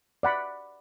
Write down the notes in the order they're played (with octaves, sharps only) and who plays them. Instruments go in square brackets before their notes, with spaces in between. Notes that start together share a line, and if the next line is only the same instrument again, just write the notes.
[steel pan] D5 F#5 B5